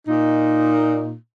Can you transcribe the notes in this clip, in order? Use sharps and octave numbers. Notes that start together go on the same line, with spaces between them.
A#2 D#4